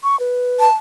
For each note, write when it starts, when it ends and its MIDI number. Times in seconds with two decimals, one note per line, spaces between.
0.03 0.19 85
0.20 0.68 71
0.60 0.73 81